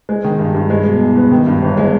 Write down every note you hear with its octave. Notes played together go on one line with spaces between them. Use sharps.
G#3
D#3
G2
G2
G#3
B2
E2
B3
D#3
G2
G1
G#3